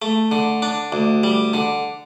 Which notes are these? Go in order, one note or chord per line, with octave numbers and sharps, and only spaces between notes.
A3
D3
D4
D2
G3
D3